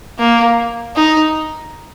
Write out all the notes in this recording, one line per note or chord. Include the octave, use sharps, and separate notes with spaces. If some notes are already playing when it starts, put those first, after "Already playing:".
A#3
D#4